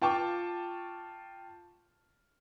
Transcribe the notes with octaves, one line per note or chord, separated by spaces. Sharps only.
F4 G5 A5 C#6 D6